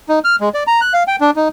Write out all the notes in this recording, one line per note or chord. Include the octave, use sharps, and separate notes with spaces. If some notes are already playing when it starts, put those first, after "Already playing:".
D#4
F6
G#3
D5
A#5
F#6
F5
G5
D4
D#4